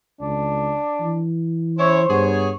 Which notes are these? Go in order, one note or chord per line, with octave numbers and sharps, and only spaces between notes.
C#2 D4
E3
C#4 E4 C5 C#5
G2 B3 G#4 C#5